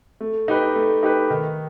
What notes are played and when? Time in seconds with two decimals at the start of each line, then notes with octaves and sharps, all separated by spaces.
0.21 A3
0.48 D#4 G4 B4
0.75 A3
1.03 D#4 G4 B4
1.30 D#3